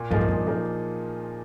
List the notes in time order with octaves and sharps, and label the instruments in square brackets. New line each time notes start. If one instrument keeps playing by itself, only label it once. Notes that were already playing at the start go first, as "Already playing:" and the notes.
Already playing: [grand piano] A#2
[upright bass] G#2 [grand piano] F3 A#3 D#4 G#4
[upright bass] F#2
[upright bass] G2 [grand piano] A#2
[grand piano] F3 A#3 D#4 G#4